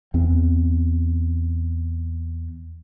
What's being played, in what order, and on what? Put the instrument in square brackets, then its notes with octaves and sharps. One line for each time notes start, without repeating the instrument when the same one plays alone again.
[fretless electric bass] E2 C4